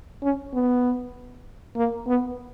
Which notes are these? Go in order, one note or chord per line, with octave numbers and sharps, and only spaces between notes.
C#4
B3
A#3
B3